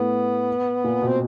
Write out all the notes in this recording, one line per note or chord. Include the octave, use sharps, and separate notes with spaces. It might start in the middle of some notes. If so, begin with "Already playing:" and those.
Already playing: A2 B3
A#2
B2
C4